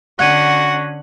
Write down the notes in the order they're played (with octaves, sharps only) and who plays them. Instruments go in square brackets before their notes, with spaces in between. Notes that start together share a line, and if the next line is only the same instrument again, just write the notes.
[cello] D3 C#4 [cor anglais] F#4 [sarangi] F#5 [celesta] F#6 G#6 D#7